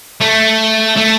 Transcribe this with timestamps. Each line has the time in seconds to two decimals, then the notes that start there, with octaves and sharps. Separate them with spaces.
0.21 A3
0.97 A3